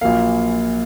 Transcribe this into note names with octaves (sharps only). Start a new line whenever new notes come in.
A#1 A#2 F#3 A#3 F5